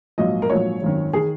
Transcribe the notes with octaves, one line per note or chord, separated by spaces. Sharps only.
A#1 G#2 F#3 A#3 D#5
A#4
A#1 G#2 F#3 A#3 C#5
G#1 F#2 D#3
D#3 G#4